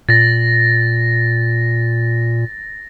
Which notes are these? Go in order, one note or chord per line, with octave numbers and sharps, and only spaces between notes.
A#2 A6 A#6